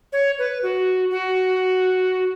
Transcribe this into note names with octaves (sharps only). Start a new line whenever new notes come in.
C#5
B4
F#4
F#4